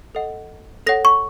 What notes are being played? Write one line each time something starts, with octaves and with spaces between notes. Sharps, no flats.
A4 D#5 F#5
A4 C#5 F#5 A#6
C#6